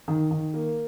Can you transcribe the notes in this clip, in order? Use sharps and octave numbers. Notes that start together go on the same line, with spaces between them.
D#3
D#3
A#3